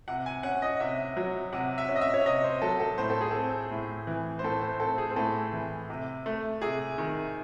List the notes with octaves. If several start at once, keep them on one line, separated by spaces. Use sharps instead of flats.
C3 F#5
G#5
C#4 F#5
D#5
C3 E5
F#3
C3 F#5
E5
C#4
D#5
E5
C#5
C3 D#5
C5
F#3 A4
A4
A2 C5
A4
G#4
C4 A4
A2
E3
C5
A2 A4
C5
C4 A4
G#4
C5
A2 A4
E3
C3
A3
C3 G#4
D#3